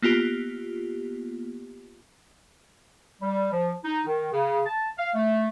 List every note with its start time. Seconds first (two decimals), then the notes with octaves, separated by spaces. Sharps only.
0.02 A#3 B3 F4 G4
3.22 G3
3.52 F3
3.85 D#4
4.06 D#3
4.33 C#3
4.66 A5
4.98 F5
5.15 A3